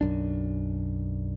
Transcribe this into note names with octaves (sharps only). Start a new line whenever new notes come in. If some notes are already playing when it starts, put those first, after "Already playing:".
B1 F#2 D4